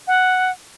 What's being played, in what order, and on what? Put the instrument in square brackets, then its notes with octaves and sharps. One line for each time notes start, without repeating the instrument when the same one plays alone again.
[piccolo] F#5